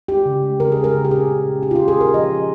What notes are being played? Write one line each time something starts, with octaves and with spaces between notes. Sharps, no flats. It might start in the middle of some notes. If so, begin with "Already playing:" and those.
G#3 G4
C#3
G#3
C#3 A#4
G#4
G#3
A#4
C#3
G4
A#2 G#4
C#4
A#2
C#4 G4
F4
C#4 G4
G#4
C#4 A#4
F3 D#5
F3